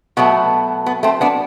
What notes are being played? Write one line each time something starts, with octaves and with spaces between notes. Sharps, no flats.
B2 F#3 A3 B3
B3
A3 C4
B3 D4